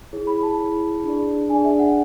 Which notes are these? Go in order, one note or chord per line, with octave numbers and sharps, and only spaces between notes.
E4 G#4 C#5
B5
A5
E4 G#4 C#5
D4 G#4 D5
D4 G#4 D5 G#5
E5
F#5